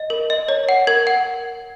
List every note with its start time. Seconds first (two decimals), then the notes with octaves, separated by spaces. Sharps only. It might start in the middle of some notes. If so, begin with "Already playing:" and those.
Already playing: D#5
0.10 A#4
0.30 D#5
0.49 C#5
0.69 F#5
0.87 A#4 G#6
1.07 F#5